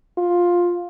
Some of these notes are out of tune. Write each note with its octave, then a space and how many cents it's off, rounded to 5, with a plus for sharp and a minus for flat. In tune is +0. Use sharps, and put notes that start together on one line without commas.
F4 +10